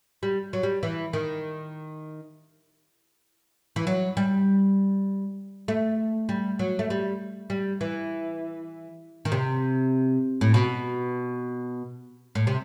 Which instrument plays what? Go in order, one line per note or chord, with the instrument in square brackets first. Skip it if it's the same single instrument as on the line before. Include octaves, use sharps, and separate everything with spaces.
[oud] G3
F#3
G3
E3
D#3
E3
F#3
G3
A3
G3
F#3
A3
G3
G3
E3
D#3
C3
A2
B2
A2
C3